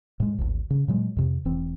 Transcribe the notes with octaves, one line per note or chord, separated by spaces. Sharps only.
A2 G#3
G#1 D2
C#3
A#2 F#3 G#3
F2 C3
E1 E3 C4